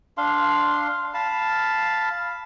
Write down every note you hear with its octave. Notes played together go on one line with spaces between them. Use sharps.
D4 F5 C6
F5 A5 B5